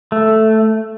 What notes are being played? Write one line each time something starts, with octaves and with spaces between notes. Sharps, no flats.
A3